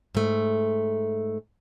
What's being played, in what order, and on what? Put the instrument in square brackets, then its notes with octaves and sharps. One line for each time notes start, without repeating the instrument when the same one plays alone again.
[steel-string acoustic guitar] G#2 A3